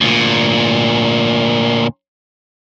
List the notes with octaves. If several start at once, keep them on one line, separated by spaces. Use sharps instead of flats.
D2 A#2